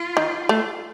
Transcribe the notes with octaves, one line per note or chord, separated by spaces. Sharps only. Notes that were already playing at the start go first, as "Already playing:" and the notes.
Already playing: F4
D#3
A3